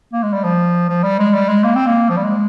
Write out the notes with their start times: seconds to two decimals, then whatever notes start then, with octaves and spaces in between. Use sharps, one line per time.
0.13 A#3
0.23 G#3
0.33 G3
0.44 F3
0.89 F3
1.03 G3
1.19 G#3
1.34 G3
1.49 G#3
1.64 A#3
1.75 C4
1.87 A#3
2.09 F3
2.17 G3
2.24 G#3